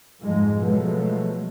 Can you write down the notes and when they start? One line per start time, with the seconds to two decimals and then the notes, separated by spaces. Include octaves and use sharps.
0.22 F2 G#2 F3 G#3
0.61 B2 F3 F#3 G#3 A3